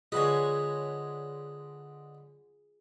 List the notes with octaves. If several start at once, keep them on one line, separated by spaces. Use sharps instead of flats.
D3 G#3 F4 G#4 B4 C#5 D#5